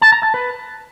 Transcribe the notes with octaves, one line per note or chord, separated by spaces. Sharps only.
A5
A#5
A5
B4